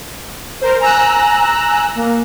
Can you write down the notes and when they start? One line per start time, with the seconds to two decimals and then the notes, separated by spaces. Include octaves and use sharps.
0.61 A#4 C5
0.81 G#5 A#5 E6 F#6
1.69 G#5
1.95 A#3